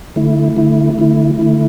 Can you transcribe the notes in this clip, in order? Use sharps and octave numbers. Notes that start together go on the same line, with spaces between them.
D3 A3 E4
D3 A3 E4
D3 A3 E4
D3 A3 E4